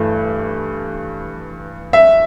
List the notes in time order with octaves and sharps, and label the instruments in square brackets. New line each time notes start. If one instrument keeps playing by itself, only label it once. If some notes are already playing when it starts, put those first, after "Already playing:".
Already playing: [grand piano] G2 E3 A3
E5